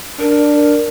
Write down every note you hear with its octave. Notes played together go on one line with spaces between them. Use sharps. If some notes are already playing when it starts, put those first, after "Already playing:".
D4 A#4